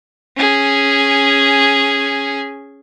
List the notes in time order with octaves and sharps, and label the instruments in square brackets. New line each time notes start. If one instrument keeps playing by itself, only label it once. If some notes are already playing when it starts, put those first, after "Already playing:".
[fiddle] C#4 G#4